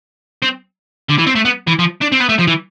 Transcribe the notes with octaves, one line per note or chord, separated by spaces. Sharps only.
C4
D3
E3
C4
A3
B3
E3
F3
D4
C4
B3
A3
F3
E3